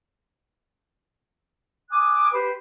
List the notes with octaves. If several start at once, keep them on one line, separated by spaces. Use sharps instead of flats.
G#5 D6 D#6 F#6
G4 B4 C5